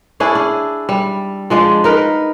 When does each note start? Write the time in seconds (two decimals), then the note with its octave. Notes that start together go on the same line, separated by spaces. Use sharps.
0.20 C#4 D4 E4 G#4
0.35 D4
0.89 G3
1.50 F3 G#3 D4
1.84 D#4 A#4 B4